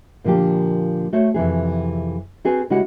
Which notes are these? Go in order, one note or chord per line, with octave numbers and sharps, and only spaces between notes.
A#2 D3 F3 A#3 G4
A3 F#4 C5 C#5
F2 C3 E3 G#4
C4 F#4 G#4 B4 C5
C#3 G#3 E4 F#4 G4 F#5